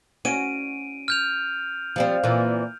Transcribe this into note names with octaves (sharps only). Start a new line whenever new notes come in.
C#4 F#4 D7 D#7
F6 G6 F7
F3 G3 C4
A#2 E3